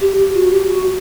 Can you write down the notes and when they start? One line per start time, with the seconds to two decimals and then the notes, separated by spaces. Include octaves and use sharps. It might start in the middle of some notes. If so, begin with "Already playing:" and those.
0.01 G4
0.18 G4
0.34 F#4
0.51 G4
0.68 F#4